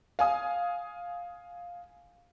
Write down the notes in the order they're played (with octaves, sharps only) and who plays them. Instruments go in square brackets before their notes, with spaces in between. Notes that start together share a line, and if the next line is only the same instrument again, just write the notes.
[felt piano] F5 G#5 D#6